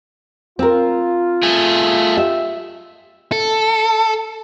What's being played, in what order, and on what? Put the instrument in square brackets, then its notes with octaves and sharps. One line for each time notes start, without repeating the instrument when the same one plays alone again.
[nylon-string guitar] C4 A#4 [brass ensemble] F4
[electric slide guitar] A3 G#4
[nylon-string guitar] G4 E5
[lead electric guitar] A4